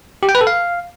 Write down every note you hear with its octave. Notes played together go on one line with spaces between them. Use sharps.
G4
G5
B4
A4
F5